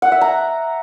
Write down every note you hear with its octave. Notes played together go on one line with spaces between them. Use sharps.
F#5
E5
A#5